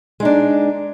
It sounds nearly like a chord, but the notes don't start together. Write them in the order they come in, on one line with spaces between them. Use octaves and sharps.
G#3 D#4 D4